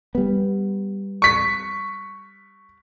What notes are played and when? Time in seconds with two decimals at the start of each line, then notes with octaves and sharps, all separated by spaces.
0.15 G3 B3
1.22 C#6 B6